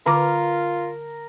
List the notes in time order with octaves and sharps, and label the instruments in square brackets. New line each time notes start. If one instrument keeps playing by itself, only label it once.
[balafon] D3 B4 D6 [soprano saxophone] F4 [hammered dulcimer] A#4